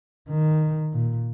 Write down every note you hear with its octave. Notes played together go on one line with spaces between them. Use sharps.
D#3
A#2